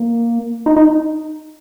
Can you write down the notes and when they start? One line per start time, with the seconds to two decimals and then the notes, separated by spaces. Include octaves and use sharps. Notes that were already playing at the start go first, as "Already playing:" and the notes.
Already playing: A#3
0.66 D#4
0.76 D#4